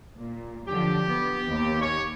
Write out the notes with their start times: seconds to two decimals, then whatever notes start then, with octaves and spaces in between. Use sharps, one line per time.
0.18 A#2
0.68 F#2 D3 F3 G4
1.08 B3
1.50 D#2
1.82 C#5